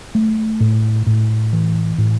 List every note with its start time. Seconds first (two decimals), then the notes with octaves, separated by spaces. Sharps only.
0.15 A3
0.60 A2
1.06 A2
1.53 E3
1.98 A2